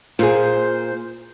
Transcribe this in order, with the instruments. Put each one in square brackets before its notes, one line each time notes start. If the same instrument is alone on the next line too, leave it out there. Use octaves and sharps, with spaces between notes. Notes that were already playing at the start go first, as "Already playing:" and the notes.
[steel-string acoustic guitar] A#2 [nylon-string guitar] F4 G#4 [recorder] C5